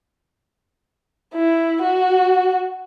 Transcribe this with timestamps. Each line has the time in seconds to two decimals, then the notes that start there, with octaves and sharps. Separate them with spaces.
1.35 E4
1.82 F#4